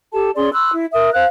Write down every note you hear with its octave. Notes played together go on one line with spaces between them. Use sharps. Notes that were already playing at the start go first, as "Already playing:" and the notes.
G4 A4 A5
C#4 G#4 D5 C6
B5 C6 E6 F#6
E4
A#4 E5 D#6
C5 F5 F#6